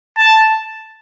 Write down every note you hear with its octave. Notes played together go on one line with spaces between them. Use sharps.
A5